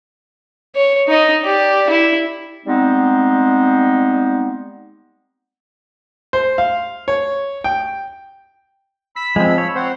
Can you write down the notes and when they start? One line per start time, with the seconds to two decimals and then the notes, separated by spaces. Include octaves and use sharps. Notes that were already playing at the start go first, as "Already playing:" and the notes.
0.76 C#5
1.07 D#4 D#5
1.43 G4 D5
1.89 E4
2.66 G3 G#3 B3 C4 D#4
6.33 C5
6.58 F5
7.08 C#5
7.64 G5
9.16 B5 E6 B6
9.36 F3 G#3 C4
9.58 C#5
9.76 C4 C5 F#5